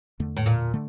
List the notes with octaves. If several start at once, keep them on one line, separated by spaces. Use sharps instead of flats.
E2 D3 A3
A2
A#2
D3 A3